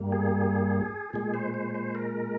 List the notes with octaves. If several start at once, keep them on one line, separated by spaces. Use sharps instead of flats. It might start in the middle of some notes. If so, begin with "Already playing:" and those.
Already playing: G2 G3 A#3
G#4
A#2 G#3 G#4
C5
C5
C5
A#4